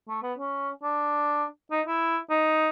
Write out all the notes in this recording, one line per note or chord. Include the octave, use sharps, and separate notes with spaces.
A3
B3
C#4
D4
D#4
E4
D#4